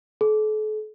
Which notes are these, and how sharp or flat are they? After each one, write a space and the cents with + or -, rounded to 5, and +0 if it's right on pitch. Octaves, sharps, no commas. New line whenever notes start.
A4 -45